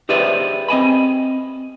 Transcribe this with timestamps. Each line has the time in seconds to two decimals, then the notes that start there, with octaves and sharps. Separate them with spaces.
0.09 G4 G#4 B4 C5 D5 E5
0.68 C4 D#5 G#5 B5